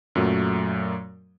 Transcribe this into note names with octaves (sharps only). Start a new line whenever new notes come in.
F#2 A#2 F#3 A3